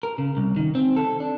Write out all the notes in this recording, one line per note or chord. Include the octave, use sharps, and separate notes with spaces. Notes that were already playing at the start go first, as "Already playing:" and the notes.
A#4
C#3
C2
D#3
C4
A4
D4